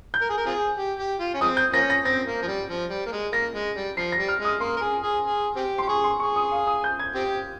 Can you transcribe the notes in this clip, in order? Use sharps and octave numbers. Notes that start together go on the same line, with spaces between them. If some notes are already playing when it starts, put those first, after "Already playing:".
G6
A#4
G#4
A#4
C4 F4 G#4
G4
G4
F4
C#4
F3 G#3 C4 D#6
G6
F3 A#3 C#4 A#6
A#6
C4 A#6
A#3
F3
G3
F3
G3
A#3
G#3
A#3 A#6
G#3
G3
F3 C7
A#6
G3
F6
G#3
D#6
A#3 C6
A#4
G#4
G#4
G#4
C4 G4
G4 C6
G#4 C#6
C6
G#4 C#6
D#6
F5
D#6
G6
G#6
C4 G4